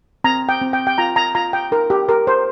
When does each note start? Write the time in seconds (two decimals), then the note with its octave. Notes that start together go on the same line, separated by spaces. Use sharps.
0.24 C4 A#5
0.49 G5
0.61 C4
0.73 G5
0.87 G5
0.98 F4 A#5
1.16 A#5
1.35 F4 A#5
1.53 G5
1.71 D#4 A#4
1.90 G4
2.08 G4 A#4
2.27 C5